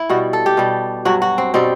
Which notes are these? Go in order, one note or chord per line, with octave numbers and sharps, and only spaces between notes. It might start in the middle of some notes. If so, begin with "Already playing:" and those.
Already playing: E4
B2 G3 F#4
A4
G4
B2 G3
G2 F#3 F#4
F#4
C4
B2 G3 C4